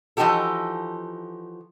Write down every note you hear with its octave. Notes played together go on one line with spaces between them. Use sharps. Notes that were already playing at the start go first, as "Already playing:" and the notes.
E3 F3 D#4 F#4 G4 A4